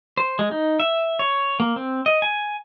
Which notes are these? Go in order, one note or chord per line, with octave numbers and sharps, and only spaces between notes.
C5
G#3
D#4
E5
C#5
A#3
C4
D#5
G#5